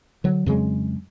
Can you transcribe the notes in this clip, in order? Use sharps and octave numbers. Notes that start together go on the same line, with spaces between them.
D3 F#3
F2 C#3 F#3 G#3